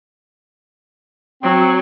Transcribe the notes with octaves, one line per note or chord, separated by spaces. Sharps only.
F#3 C4